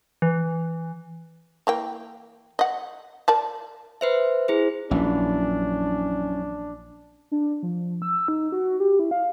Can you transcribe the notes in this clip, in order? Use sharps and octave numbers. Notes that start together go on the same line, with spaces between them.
E3
E3 A#3 G5
D#5 F#5
A#4 D5 A5
B4 C5 E5
E4 G#4 C5
A#1 F#2 E3 C#4 D4
D4
F3
E6
D#4
F#4
G4
E4
F5